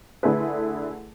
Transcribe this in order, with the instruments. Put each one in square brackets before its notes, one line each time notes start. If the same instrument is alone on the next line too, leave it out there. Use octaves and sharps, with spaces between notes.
[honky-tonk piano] D3 A3 E4 G#4 B4